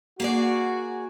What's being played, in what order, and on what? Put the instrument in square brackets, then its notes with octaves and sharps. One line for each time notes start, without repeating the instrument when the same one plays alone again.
[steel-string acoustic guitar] A#3 G#4 D5 [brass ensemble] F#4